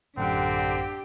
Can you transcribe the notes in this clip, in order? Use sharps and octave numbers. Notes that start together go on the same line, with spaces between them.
A1 F#2 D3 C4 D4 G4 F#5